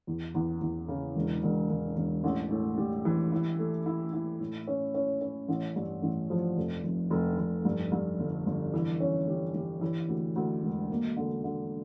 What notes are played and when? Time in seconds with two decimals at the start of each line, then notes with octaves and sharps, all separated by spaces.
0.07 E2
0.34 E2
0.61 E2
0.88 C#3
1.16 E1
1.43 E1
1.70 E1
1.97 E1
2.24 A1
2.51 A2
2.78 G3
3.05 E3
3.32 E4
3.59 A3
3.86 E4
4.13 E4
4.40 A2
4.67 C#4
4.94 C#4
5.21 C#4
5.48 A1
5.76 G2
6.02 A1
6.30 F3
6.57 F1
6.84 F1
7.10 F1
7.38 F1
7.65 G2
7.92 G2
8.19 G1
8.47 G1
8.74 E3
9.00 C#4
9.27 G3
9.54 G3
9.81 E3
10.09 D2
10.36 D2
10.63 E1
10.90 A#3
11.17 D3
11.44 D3